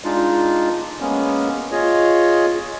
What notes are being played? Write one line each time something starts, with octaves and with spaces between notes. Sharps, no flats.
G#3 D4 D#4 F4
G#3 A#3 B3 C#4
F4 G#4 C#5 D#5